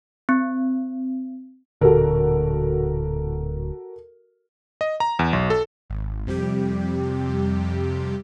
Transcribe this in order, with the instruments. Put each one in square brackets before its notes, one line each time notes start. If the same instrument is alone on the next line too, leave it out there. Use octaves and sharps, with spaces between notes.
[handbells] C4
[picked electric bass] D1 A#2 D3 [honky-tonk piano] F#4 A4 A#4
[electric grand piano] D#5
A#5
E2
B1
A4
[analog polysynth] G#1
F2 C3 G3 G4